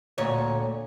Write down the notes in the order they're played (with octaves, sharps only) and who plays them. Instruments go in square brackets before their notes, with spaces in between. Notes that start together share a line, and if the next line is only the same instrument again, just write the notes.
[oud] D2 A#2 C#5